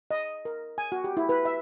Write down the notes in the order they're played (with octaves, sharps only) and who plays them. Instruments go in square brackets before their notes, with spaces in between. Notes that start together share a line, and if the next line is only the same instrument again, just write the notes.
[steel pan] D#5
A#4
G#5
F#4
G4
E4
B4
E5